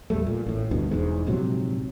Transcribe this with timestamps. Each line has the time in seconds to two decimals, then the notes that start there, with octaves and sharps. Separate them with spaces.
0.10 A#1 E2 G3 A3
0.27 A#2
0.46 A1 A2
0.71 D2 G2 B2
0.91 E1 E2 G#2
1.26 A#1 G#2 C3 F#3